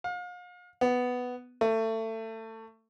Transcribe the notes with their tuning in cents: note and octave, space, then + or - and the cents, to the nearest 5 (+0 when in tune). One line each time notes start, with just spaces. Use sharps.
F5 +40
B3 +5
A3 +25